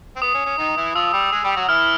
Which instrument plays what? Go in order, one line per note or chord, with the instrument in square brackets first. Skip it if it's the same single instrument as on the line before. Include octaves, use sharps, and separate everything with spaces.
[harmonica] C4
[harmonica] B3 [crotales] D#6
[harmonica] C#4
C#4
D#3 D#4
E3 E4
[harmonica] F3 F4 [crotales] E6
[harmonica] G3 G4
G#3 G#4
G3 G4
F#3 F#4
[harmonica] E3 E4 [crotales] F6